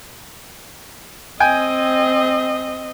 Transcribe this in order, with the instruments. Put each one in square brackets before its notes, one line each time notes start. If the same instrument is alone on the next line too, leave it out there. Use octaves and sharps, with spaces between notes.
[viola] C4 D#5 [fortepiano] G5 G#5